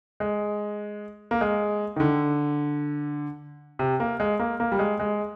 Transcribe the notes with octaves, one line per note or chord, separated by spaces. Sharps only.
G#3
A#3
G#3
D#3
D3
C3
A#3
G#3
A#3
A#3
G3
G#3
G#3